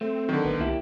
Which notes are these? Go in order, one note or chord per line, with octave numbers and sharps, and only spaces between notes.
A3 C4
D3 D#3 F#3
A1 B3
C2 A#3 E4 G4